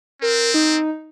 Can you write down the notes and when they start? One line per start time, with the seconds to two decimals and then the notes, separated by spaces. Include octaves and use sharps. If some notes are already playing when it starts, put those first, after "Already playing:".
0.22 C4 A#4
0.54 D#4